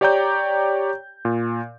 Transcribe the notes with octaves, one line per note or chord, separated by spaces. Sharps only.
G4 C#5 D5 G5 A#5 G6
A#2